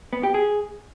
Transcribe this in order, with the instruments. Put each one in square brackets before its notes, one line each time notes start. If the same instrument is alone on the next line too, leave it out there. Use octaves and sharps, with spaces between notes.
[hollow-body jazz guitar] B3
G4
G#4